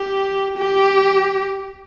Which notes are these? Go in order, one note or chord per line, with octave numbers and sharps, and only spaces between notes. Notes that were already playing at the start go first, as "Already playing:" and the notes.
Already playing: G4
G4